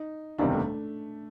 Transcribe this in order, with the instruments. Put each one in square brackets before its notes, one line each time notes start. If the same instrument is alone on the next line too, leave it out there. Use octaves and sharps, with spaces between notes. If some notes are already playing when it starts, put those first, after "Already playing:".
Already playing: [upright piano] D#4
[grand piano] F#1 E2 C3 D#3 G3 [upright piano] D4
[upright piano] A3